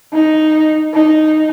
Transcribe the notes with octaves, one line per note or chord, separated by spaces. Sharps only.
D#4
D#4